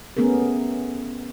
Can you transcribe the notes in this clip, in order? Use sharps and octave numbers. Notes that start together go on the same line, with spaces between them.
A3 B3 C#4 G#4 A#4